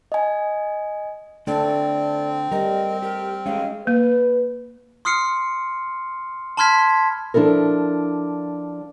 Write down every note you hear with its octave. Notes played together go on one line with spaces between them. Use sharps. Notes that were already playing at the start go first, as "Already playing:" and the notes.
D#5 G#5
D3 A3 C4 A4 D5
G3 A#4 D#5
G4 A#4
G#3 C#4 G4 F5
A#3 B4
C6 D#6 F6 C7 C#7
A5 B5 C6 F6 G#6 B6
F3 D4 E4 A4 A#4